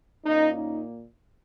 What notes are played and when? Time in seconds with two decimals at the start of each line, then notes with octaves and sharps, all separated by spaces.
0.25 A#2 A#3 C#4 D#4
0.53 D#4